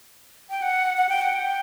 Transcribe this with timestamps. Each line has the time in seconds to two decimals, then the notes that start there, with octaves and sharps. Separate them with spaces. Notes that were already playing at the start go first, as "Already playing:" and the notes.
0.50 G5
0.62 F#5
0.97 F#5
1.09 G5
1.21 F#5
1.33 G5